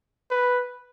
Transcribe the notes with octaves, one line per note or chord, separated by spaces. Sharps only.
B4